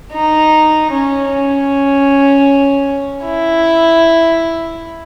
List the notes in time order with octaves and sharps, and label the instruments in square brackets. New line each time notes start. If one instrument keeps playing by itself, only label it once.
[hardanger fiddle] D#4
C#4
C#4
E4